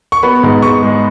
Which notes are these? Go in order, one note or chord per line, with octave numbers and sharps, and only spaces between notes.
C#6
B3 B5
G#2
G#2 C#6
G#3